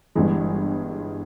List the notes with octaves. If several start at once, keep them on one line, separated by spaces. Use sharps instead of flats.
G1 G2 E3 G#3